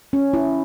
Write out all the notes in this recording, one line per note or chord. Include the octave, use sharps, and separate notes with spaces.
C#4
E4